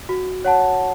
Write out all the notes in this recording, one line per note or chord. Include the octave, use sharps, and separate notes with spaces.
F#4
C#5 F#5 A5